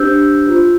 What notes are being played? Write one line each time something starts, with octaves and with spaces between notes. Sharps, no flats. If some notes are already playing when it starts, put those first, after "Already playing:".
Already playing: D4 G4 C5 E6 G6
F4 C5